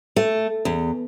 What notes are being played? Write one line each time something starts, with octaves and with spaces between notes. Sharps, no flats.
A3
E2